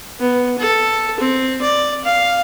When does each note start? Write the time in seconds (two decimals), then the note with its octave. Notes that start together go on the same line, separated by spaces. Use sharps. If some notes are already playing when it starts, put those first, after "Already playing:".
0.19 B3
0.58 A4
1.19 C4
1.62 D5
2.05 F5